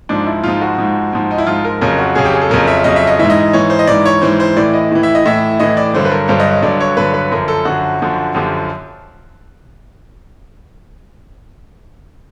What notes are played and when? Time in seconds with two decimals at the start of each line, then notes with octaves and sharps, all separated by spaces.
0.09 G#2 F3 D4
0.27 E4
0.43 G#2 F3 F4
0.61 F#4
0.78 G#2 F3
1.13 G#2 F3
1.31 D#4
1.38 E4
1.47 G#2 F3 F4
1.64 A#4
1.81 F2 C#3 F#3 A#4
1.99 F#4
2.15 F2 C#3 F#3 G#4
2.25 G4
2.33 G#4
2.42 A4
2.50 F2 C#3 F#3 A#4
2.67 E5
2.84 F2 C#3 F#3 D#5
2.96 E5
3.07 D#5
3.19 G#2 E3 E5
3.30 D#5
3.53 G#2 E3 C#5
3.70 C5
3.79 D#5
3.87 G#2 E3 D5
4.06 C#5
4.22 G#2 E3 C5
4.40 C5
4.57 A2 E3 D5
4.74 D#5
4.91 A2 E3
5.03 E5
5.15 D#5
5.26 A2 E3 E5
5.60 A2 E3 D#5
5.77 D5
5.94 G2 D3 F#3 C5
6.05 B4
6.11 A#4
6.28 G2 D3 F#3 C5
6.40 D#5
6.52 D#5
6.62 G2 D3 F#3 D5
6.80 C#5
6.97 G2 D3 F#3 B4
7.14 B4
7.31 F#2 D3 F3 A#4
7.48 A4
7.65 F#2 D3 F3 F#4
8.01 F#2 D3 F3
8.34 F#2 D3 F3 G4